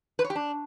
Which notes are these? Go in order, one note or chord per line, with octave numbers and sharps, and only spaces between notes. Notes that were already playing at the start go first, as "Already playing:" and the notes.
B4
C#5
G4
D4